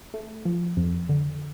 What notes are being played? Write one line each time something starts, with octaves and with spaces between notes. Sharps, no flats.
A3
F3
F2
D3